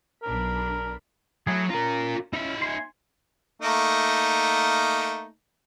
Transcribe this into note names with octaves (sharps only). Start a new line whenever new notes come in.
B1 D4 A#4 B5
F#3 A3 E4 G#4
C#4 F4 A#4 A#5
C#4 D#4 E4 E5
G#5 C6
A3 A#3 D#4